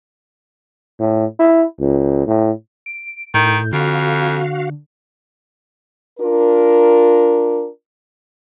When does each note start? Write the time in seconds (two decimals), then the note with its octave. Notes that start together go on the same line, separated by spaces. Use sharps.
1.00 A2
1.39 E4
1.80 C#2
2.27 A2
2.86 D7
3.34 A2 D#3 G6
3.73 F2 D3 F#4 F5
6.19 D4 F4 A#4